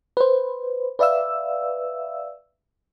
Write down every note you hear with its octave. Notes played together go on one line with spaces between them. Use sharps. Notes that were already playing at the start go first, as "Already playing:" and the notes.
B4 C5
B4 D5 E5 F5 E6